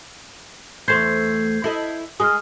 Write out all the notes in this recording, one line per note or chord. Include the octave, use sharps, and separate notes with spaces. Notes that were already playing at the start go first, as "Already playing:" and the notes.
E2 A3 C5 G6 G#6 C7
E4 A4 D#5
G#3 G#4 D#6 F6